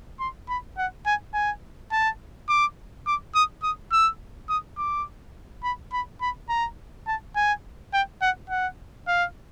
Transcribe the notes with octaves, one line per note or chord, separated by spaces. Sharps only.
C6
B5
F#5
G#5
G#5
A5
D6
D6
D#6
D#6
E6
D#6
D6
B5
B5
B5
A#5
A5
G#5
G5
F#5
F#5
F5